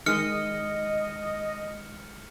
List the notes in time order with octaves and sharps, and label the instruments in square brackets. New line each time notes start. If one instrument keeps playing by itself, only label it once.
[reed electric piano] D#3 G#3 [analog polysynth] D#5 [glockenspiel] F6 C#7